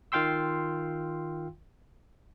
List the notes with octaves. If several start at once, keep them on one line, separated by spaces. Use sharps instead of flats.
D#3 F4 F5 G5 C6 E6